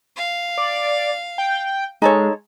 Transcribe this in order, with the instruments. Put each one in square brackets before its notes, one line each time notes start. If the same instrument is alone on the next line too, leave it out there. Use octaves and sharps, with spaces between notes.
[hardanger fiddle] F5
[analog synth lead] D5
G5
[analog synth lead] G#3 [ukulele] D#4 A4 C#5